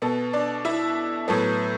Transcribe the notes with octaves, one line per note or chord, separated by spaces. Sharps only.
B2 B3 A4
D4 D5
E4 E5
A2 F#3 B3 A4